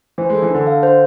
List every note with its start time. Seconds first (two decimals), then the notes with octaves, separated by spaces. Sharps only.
0.18 E3 C5
0.30 G#3 A4
0.42 E3
0.50 D3 D4
0.67 F5
0.83 C5